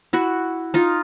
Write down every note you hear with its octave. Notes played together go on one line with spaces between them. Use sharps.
E4 F#4
D#4 F4